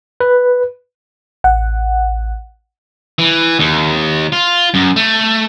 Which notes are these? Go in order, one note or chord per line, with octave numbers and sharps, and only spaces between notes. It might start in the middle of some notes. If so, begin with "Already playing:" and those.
B4
A1 F#5
E3
D#2
F4
F#2
A3